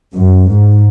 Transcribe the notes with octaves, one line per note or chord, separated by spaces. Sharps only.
F#2
G#2